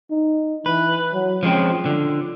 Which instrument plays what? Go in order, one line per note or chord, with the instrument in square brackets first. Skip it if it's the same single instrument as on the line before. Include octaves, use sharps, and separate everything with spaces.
[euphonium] D#4
[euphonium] E3 [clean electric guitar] B4
[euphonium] F#3
[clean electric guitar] F3 G#3 C4 [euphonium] C#4
[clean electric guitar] D3 [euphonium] F4